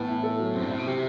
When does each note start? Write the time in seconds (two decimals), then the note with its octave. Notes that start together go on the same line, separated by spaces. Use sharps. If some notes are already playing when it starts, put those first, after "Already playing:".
Already playing: A2 E3 B3
0.08 E4
0.23 A4
0.39 F#3
0.54 F#2 C4
0.63 G2
0.71 A2 E4
0.78 B2
0.87 C3 G4